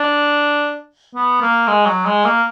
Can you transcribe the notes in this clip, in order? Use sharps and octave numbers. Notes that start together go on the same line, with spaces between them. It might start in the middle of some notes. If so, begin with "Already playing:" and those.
Already playing: D4
B3
A#3
G#3
F#3
G#3
A#3